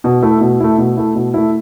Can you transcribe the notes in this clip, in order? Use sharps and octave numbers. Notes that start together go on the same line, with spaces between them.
B2
A3 E4
B2
A3 E4
B2
A3 E4
B2
A3 E4